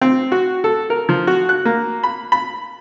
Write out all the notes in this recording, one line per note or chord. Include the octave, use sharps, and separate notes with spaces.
C4
F#4
A4
A#4
F3
F#4
F#6
A#3
B5
B5